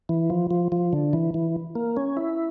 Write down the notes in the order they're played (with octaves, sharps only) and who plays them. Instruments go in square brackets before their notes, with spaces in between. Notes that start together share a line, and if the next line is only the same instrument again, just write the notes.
[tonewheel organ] E3
F3
F3
F3
D3
E3
E3
A#3
C#4
E4